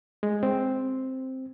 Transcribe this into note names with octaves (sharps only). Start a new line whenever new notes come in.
G#3
C4